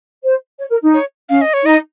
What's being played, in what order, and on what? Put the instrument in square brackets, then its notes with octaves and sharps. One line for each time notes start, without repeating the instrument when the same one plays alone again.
[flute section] C5
C#5
A#4
D#4
[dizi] C#5
[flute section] C#4 [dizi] F5
[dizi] D#5
C#5
[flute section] D#4 [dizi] D#5